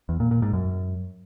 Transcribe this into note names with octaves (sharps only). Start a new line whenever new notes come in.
E2
A#2
A#2
G#2
F#2